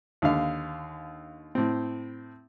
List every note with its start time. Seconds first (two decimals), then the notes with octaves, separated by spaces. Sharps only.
0.22 D#2 D3 F5
1.55 A2 C4